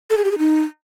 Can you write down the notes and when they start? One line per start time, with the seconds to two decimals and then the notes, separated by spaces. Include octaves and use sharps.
0.10 A4
0.17 G#4
0.24 G4
0.31 G#4
0.38 D#4